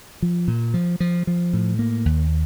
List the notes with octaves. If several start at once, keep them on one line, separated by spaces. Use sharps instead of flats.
F3
A#2
F3
F3
F3
A2
A#3
D#2